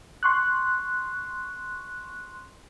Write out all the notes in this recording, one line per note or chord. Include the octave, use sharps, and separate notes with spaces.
C6 C#6 F#6